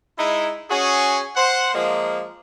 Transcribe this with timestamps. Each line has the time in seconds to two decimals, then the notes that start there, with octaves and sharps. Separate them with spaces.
0.17 G#3 D#4 E4
0.69 C#4 F#4 G#4
1.36 C5 F#5
1.74 F3 G#3 A#3